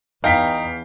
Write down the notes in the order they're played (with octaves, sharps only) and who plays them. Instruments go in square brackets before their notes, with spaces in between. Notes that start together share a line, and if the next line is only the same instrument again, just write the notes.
[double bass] E2 [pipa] D#4 [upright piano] F5 G5 B6